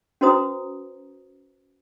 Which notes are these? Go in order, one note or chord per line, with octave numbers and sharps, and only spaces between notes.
C#4 F#4 B4 C5 A#5 D#6